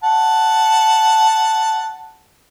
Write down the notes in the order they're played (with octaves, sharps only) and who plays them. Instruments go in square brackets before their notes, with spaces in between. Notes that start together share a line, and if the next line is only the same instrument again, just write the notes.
[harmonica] F#5 A5